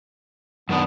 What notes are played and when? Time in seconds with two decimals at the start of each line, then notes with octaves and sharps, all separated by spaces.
0.69 F#2 D#3 B3 D4